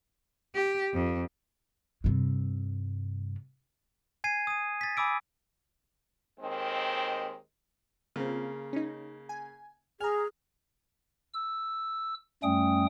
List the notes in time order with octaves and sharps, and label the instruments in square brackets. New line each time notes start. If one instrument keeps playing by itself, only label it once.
[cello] G4
F2
[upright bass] G2 C3
[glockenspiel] G#5 G#6 C7 D#7
D#6 D#7
A6 B6
G#5 B5 D6 E6 D7
[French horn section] D#2 D#3 G#3 C4
[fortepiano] C#3 A#3 [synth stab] C4 F4
[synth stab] C#4 D#4
G#5
[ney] G#4 [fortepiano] G#5 [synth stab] A#5 F6
[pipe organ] E6
F#2 G3 A3 C#4 G5 D#6